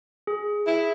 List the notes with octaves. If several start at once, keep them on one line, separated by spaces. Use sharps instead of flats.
G#4
E4